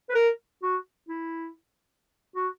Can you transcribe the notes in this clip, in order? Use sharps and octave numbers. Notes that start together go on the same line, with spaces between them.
B4
A#4
F#4
E4
F#4